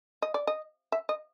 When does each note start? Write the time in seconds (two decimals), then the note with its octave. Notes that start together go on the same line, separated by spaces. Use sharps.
0.22 D#5
0.34 D5
0.47 D#5
0.92 E5
1.09 D#5